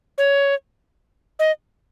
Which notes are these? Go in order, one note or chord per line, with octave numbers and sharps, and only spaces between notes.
C#5
D#5